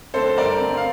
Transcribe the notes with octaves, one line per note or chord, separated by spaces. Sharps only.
D3 A3 C4 A4 C5
G2 A#4 D5
D3 A3 C4
F5